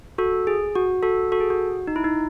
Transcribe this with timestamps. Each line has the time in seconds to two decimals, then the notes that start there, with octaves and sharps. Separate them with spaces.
0.18 F#4 A4
0.47 G#4
0.75 F#4
1.03 F#4 A4
1.32 F#4 A4
1.40 G#4
1.50 F#4
1.87 D#4
1.96 E4
2.04 D#4